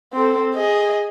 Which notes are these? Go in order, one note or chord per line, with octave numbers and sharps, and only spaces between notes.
C4 A4
G#4 D#5